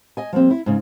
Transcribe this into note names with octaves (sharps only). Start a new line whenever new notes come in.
D#5 G#5
F3 G3 A#3 C4
E4
G#2 C#3